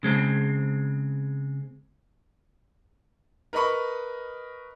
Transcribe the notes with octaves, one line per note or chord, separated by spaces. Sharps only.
C#3 G#3 C4
A#4 B4 D#5 B5 C#6